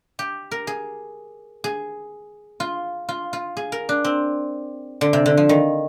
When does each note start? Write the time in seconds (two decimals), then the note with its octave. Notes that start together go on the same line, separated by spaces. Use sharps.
0.19 G4
0.51 A#4
0.67 G#4
1.64 G#4
2.60 F4
3.09 F4
3.33 F4
3.57 G#4
3.72 A#4
3.89 D4
4.04 C4
5.01 D3
5.13 C3
5.26 D3
5.37 F3
5.49 D#3